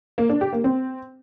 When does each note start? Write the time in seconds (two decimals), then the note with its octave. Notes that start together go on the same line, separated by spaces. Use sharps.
0.18 A#3
0.29 D4
0.41 G4
0.53 A#3
0.64 C4